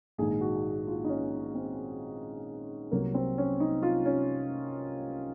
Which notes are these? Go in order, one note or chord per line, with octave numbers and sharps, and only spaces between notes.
A#1 G#2 D#3 G#4
F#4
F4
D#4
C#4
C4
C2 C3 F#3 A#3
C4
C#4
D#4
F4
C#4